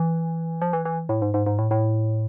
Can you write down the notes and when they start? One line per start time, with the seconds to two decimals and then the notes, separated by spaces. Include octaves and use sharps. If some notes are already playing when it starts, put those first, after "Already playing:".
Already playing: E3
0.62 F3
0.73 E3
0.85 E3
1.09 A2
1.22 G#2
1.34 G#2
1.46 G#2
1.59 A2
1.71 A2